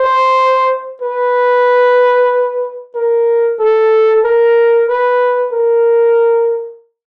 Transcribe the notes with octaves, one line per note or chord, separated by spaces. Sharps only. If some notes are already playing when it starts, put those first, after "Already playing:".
Already playing: C5
B4
A#4
A4
A#4
B4
A#4